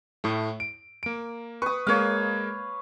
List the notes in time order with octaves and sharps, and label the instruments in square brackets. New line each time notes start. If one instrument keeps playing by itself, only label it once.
[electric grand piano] A2 A3
D7
A#3 D7
[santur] B4 D#6 [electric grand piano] C#6
[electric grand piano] G#3 A#3 [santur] C#5 F5